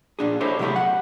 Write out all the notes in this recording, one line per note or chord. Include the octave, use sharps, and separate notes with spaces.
A#2 D4 G#4
E4 G4 A4 C5 C#5 D#5
C3 F#3 A3 E4 G4 G#4
F#5